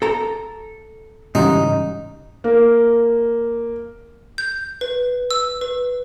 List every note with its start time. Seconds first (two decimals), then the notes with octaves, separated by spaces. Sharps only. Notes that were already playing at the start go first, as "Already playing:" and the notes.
0.02 A4 A#5
1.35 G#2 C#3 E3 G3 C#4 D#4
2.44 A#3
4.38 G6
4.81 B4
5.31 E6
5.61 B4